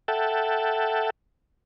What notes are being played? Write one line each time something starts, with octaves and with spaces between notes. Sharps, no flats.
A4 E5 F#5 G5 A5